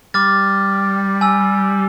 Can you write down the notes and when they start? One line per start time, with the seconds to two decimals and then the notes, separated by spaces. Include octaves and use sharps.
0.14 G3 D6 F6 A6
1.21 G#5 E6